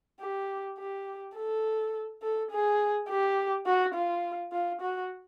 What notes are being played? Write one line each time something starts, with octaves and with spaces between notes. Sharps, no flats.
G4
G4
A4
A4
G#4
G4
F#4
F4
F4
F#4